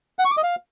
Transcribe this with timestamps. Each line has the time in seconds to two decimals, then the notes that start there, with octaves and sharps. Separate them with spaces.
0.19 F#5
0.25 C#6
0.31 D6
0.37 D#5
0.43 F5